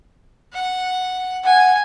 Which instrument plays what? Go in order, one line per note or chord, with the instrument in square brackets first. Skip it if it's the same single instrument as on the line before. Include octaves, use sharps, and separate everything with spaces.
[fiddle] F#5
[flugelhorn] F#5 [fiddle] G#5